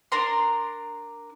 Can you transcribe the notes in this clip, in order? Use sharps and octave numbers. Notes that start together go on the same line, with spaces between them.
D4 A#4 A#5 C6